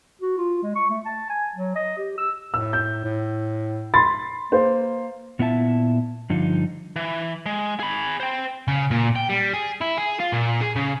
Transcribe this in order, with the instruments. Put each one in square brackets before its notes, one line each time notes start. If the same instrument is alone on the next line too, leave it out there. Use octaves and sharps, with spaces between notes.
[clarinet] F#4
F4
G#3
C#6
A3
A5
G#5
F#3
D#5
G4
E6
[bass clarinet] A2 [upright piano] E6
[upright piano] G6
[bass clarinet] A2
[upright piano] B5 C6 A6
[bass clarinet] A#3 [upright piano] C5
[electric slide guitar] A#2 B3 E4 E5 A5
G2 D3 F3 D#4
[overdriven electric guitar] E3
G#3
G#4 B5
C5 G5
C#3
A#2
G5
G3
G#4
E4
G#4
F4
A#2
G#4
C#3